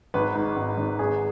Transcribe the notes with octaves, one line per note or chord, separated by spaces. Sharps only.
G#1 B4
G#2
G#1
G#1
G#1 G#4